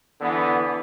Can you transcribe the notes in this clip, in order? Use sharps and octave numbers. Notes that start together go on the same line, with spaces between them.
D3 E3 B3